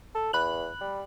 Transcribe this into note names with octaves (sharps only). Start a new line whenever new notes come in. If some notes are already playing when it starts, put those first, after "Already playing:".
A4
E2 B5 F#6 F#7
G3